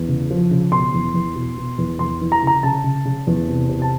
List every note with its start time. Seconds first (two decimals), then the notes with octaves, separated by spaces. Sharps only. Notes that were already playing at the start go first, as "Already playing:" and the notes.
Already playing: E2
0.08 C#3
0.30 F3
0.51 C#3
0.72 B2 C6
0.94 E2
1.14 E2
1.35 B2
1.57 B2
1.78 E2
1.99 E2 C6
2.21 E3
2.32 A#5
2.43 C#3 A#5
2.63 C#3 A5
2.84 C#3
3.05 C#3
3.27 E2
3.48 C3
3.69 C3
3.82 A5